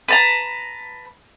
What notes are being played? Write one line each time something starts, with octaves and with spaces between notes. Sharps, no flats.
B4 A5 A#5